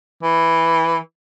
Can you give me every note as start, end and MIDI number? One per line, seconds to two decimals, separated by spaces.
0.23 0.97 52